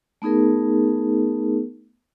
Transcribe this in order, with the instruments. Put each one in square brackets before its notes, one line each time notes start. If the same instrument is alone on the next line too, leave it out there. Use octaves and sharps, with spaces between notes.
[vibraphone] A3 B3 D#4 G#4 A#4